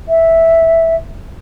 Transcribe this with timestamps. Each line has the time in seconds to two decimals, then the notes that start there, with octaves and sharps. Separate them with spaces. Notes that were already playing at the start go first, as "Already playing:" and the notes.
0.09 E5